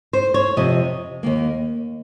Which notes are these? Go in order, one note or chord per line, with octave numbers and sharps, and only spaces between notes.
C5
C#5
F2 C3 F3 D#5
D#2 D#3 A#3